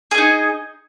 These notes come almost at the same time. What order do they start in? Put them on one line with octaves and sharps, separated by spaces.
G#4 D#5 D#4